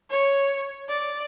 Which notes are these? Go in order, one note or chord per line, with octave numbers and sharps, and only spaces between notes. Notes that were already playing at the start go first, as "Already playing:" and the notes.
C#5
D5